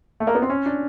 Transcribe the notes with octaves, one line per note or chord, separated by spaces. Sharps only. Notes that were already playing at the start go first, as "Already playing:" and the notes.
A3
A#3
B3
C4
C#4
D4